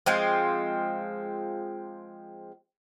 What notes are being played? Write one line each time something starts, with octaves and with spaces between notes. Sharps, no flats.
F3 G#3 C4